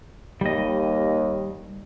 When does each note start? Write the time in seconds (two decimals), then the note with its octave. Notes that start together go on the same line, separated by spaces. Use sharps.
0.41 D#2 G3 D#5